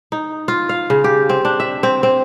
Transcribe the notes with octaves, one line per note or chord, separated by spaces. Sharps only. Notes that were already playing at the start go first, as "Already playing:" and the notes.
D#4
F4
F5
C#3
G4
C4
D4
E5
C4
C4